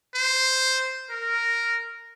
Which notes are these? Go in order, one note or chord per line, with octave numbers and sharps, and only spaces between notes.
C5
A#4